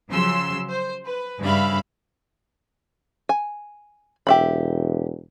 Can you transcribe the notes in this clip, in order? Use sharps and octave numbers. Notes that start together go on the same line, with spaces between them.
C#3 F3 F#3 C6 E6
C5
B4
G2 C#3 G3 E5 F5 B5
G#5
E1 G4 E5 B5